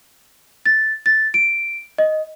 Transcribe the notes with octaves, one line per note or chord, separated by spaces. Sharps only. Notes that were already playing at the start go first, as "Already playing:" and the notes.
A6
A6
D7
D#5